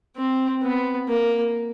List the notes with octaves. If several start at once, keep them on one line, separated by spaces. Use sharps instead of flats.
C4
B3
A#3